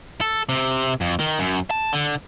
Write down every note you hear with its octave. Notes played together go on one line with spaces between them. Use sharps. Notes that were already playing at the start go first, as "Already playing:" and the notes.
A4
C3
F2
D#3
F#2
A5
D3